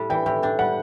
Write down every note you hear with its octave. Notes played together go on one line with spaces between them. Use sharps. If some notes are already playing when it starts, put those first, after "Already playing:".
Already playing: A2 G3 D4
E3 G5
A2 G5
D4 G5
G3 F#5